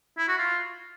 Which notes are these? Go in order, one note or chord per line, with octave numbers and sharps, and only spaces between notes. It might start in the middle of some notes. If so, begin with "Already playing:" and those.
E4
F#4
F4